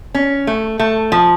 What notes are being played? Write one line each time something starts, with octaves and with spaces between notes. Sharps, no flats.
C#4
A3
A3
F3